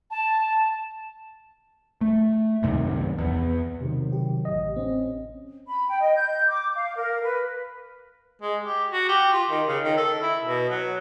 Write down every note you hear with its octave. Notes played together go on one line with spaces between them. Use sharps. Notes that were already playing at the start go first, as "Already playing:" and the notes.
A5
A3
C2 F#2 C3 D#3
E2
C3 D#3 F#3
G4
A1 D#5
C4 C#4
B5
G5
D#5
G6
D6
F5
A#4
B4
G#3
G4
F#4
G4
F4
D#3
C#3
D#3
A4
E4
B2
F#3